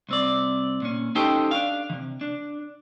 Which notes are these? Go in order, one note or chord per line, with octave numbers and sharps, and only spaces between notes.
C2 C4 D5
A#2 C#4
C#4 D#4 G4 A4 C5 G5
D4 F5
C3 D#3
D4